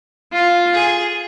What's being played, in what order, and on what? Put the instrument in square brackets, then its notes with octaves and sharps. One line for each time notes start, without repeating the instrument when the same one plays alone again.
[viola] F4
[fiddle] G#4